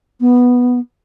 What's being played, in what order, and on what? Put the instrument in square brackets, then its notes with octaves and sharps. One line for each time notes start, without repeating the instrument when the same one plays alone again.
[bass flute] B3